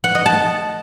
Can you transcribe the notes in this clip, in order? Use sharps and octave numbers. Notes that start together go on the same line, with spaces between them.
F#5
D#5
A5